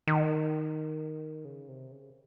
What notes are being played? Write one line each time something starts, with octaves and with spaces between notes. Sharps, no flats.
D#3
C#3
C3
C#3